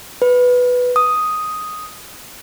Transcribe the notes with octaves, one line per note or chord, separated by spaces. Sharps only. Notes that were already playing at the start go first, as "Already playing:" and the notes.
B4
D#6